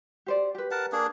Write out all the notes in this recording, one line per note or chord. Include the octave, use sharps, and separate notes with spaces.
G4 C5 D5
G4 B4
A#4 F#5 A5
A#3 D4 G#4